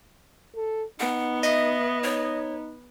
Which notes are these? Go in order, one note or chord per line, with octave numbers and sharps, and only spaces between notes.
A4
B3 D#4 F#5
D#5 E5
D#4 C#5